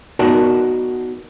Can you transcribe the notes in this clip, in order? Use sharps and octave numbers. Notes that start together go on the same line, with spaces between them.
B3 D#4 F#4 A#4 D5 A5